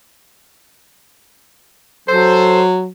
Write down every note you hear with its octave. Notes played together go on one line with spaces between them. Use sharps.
F#3 A4 C5